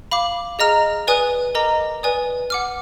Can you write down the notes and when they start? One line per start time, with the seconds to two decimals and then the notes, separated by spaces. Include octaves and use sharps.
0.11 F5 B5 D6
0.59 G#4 D#5 A#5 F6
1.07 B4 D5 G#5 D#6 F#6
1.55 A#4 D#5 A#5 D6
2.03 B4 D5 G#5 D#6
2.50 F#5 D6 F6